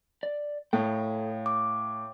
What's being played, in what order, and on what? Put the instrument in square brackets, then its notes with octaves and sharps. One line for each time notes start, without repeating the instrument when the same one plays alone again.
[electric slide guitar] D5
[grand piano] A2 [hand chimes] A4 [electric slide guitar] C#5 F5 G5
[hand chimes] D6